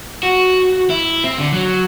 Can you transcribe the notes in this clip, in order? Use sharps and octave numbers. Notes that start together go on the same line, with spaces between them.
F#4
E4
C4
D3
F#3